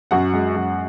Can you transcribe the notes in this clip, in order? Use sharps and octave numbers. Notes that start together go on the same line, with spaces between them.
F#2 F#4 F#5
G#3
F#2